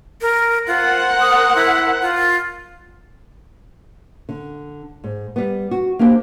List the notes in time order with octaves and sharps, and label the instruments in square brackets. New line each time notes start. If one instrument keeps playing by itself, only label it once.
[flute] A#4
[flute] F4 [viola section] A#4 C5 F#5
[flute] D#6
E4
F4
[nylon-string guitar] D3
G#2
G3 B3
F#4
A#3 D4 E4 G4 C5 G5